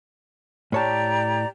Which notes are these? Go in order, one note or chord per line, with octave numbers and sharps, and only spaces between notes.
A2 G4 C#5 D5 A5 A#5